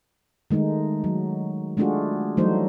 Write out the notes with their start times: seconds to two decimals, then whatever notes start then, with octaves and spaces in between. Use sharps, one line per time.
0.51 D#3 G#3 A3 D#4
1.04 F#3
1.77 G#3 A3 D4 F4 F#4 G#4
2.37 E3 F#3 G3 A3 D#4 C5